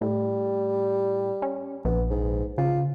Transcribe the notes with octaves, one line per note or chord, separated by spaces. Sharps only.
A2 G3
C#4
A#1 B3
G#2
C#3 F4